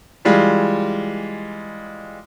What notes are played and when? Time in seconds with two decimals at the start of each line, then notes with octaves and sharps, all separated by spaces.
0.25 E3 G3 G#3 F4